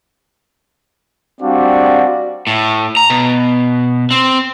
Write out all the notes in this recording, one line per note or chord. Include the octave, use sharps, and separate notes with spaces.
G3 C4 D4 F#4 D5 F5
A2
A#5
B2
C4